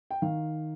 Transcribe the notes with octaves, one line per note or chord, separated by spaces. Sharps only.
G5
D#3 F5